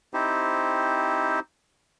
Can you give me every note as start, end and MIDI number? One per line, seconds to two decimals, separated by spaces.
0.14 1.40 60
0.14 1.40 63
0.14 1.40 64
0.14 1.40 67
0.14 1.40 72